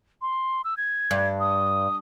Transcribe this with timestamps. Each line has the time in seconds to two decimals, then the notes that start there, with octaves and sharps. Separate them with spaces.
0.22 C6
0.64 E6
0.77 G#6
1.11 G2
1.40 D#6